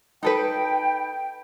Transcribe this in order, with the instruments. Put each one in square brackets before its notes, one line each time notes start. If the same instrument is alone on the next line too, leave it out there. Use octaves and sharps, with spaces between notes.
[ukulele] D#4 A4 B4 [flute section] G5